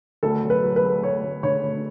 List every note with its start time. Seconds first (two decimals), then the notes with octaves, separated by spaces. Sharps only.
0.23 D2 A4
0.43 F#3
0.50 B4
0.63 F#3
0.76 B4
0.83 A3
1.03 A3 C#5
1.23 D2
1.43 D3 C#5
1.63 D2